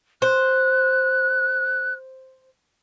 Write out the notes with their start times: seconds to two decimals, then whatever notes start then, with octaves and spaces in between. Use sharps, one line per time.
0.22 C5 F#6